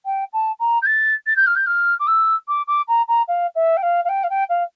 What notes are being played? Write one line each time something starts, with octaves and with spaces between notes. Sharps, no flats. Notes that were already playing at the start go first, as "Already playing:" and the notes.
G5
A5
A#5
G6
A6
A6
G6
F6
G6
F6
D6
E6
D6
D6
A#5
A#5
F5
E5
G5
F5
F5
G5
F5
G5
F5